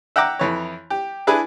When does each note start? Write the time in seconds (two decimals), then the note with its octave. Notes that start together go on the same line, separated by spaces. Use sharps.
0.16 E5 F#5 G5 A#5 D6
0.39 F2 E3 C#5
0.90 G4
1.27 D4 E4 G#4 B4